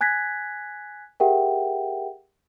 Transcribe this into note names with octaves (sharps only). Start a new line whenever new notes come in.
G#5 F#6 G#6 A#6 B6
G4 G#4 A#4 E5 F#5 G5